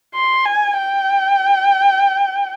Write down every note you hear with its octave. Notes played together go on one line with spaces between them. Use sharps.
C6
G#5
G5